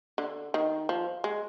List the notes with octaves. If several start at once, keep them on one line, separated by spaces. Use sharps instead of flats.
D3
D#3
F3
G#3